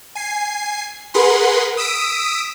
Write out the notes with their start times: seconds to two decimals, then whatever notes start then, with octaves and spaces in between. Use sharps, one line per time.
0.15 G#5 C7
1.14 G#4 A#4 B4 F#5 B5 C6
1.77 D#6 E6 B6 D7